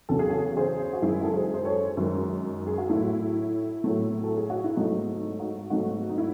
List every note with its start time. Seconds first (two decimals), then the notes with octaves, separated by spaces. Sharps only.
0.09 E2 C#3 F#3 A4
0.19 G#4
0.29 F#4 A4
0.57 G#4 C5
0.93 F#4
1.02 F#2 D#3 G#3 E4 G#4
1.24 A4
1.34 G#4 C5
1.54 C5
1.65 A4 C#5
1.97 F#2 D#3 G#3
2.67 G#4
2.78 F#4
2.90 A2 F#3 A3 E4
3.84 A2 F#3 A3
4.24 A4
4.37 G#4
4.50 F#4
4.64 E4
4.77 G#2 F#3 A3 D#4
5.39 D#4 F#4
5.70 G#2 F#3 A3 D#4 F#4
6.09 D#4
6.18 E4